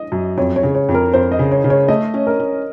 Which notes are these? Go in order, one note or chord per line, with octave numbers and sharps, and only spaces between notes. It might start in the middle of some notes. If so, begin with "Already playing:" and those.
Already playing: D#5
F#2
F2 C#5
C#5
C#3
C#5
F2
A#4
F2 C5
D#5
C#3
C#5
C#3
C#5
A3 D#5
C#4
A#4
C#4